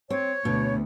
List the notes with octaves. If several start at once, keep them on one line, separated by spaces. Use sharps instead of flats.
C4 C#5
D2 B2